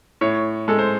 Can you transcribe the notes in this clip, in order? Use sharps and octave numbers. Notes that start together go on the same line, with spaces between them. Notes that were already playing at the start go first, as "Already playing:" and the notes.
A2 C#5
G#3 A4
C5